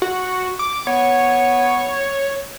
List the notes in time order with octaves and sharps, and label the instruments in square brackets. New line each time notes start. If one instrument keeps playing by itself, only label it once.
[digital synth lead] F#4
D6
[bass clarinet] B3 [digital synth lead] C#5